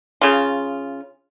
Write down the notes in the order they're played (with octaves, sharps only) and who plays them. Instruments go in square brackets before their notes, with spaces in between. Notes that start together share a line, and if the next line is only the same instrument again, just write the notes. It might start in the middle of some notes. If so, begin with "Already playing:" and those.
[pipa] C#3 F4